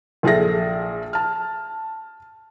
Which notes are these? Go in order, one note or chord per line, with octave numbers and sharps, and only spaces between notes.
A#1 F3 G#4 A4 E5 A#6
A5 F6